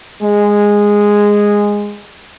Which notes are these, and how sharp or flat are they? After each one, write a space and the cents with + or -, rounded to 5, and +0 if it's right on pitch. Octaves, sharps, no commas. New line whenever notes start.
G#3 -10